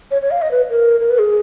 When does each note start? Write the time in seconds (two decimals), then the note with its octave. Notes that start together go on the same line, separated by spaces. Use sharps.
0.11 C#5
0.22 C#5
0.31 F5
0.42 D#5
0.51 B4
0.70 A#4
1.00 A#4
1.10 B4
1.20 G#4